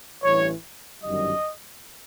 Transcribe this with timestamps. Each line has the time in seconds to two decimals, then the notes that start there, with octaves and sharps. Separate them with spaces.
0.23 A1 G2 E3 C#5
1.04 G1 F#2 D#3 G3 D#5